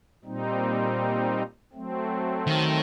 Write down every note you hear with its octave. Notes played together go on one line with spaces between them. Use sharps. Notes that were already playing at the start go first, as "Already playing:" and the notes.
A#2 G3 C4 D#4
F#3 A3 C4
D#3